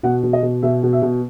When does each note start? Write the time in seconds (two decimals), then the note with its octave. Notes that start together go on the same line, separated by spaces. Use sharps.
0.03 B2 F#5
0.23 B2
0.33 D#5
0.43 B2
0.62 B2 E5
0.83 B2
0.93 E5
1.02 B2